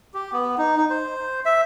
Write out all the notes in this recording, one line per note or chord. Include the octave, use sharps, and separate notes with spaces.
G4
B3
D#4
D#4
C5
E5